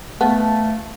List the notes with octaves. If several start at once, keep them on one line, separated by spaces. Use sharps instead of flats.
A3 B3 F5 A5